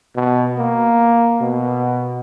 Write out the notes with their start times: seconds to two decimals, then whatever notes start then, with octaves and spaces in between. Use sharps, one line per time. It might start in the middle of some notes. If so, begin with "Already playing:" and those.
0.16 B2
0.58 A#3
1.41 B2